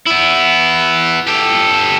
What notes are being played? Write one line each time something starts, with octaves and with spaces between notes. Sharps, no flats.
B3 E4
G4 A4